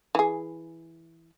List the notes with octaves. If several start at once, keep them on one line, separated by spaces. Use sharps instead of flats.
E3 G#4